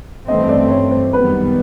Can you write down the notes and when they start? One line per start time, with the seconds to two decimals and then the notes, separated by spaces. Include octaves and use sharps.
0.28 G2 E3 A3 C4 D#5
0.49 D5
0.70 C#5
0.91 C5
1.13 F#2 D#3 G3 B3 B4